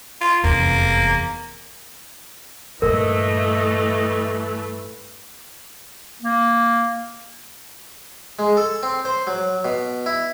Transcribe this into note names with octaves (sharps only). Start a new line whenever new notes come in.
F4
F1 E2 A#3
G2 A#2 E3 A3 A#4 D#5
A#3
G#3
A4
C4
C5
F#3
B2
E4